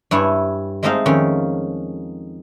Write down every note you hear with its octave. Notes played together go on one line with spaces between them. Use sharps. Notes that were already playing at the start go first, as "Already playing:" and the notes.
G2 E4 C#5 G#5
G#3 A3 C4 D#4 D#5 F5
F2 D#3 C#4 F4